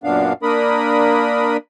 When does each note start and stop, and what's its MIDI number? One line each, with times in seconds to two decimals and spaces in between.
0.04 0.33 42
0.04 0.33 46
0.04 0.33 59
0.04 0.33 62
0.04 0.33 77
0.43 1.57 58
0.43 1.57 62
0.43 1.57 70
0.43 1.57 83
0.43 1.57 87